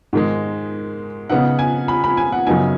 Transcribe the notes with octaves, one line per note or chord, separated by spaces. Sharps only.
G#2 D#3 G#3
C#3 B3 D#4 F#5
G#5
B5
B5
G#5
F#5
F#2 C#3 B3 D#4 G#5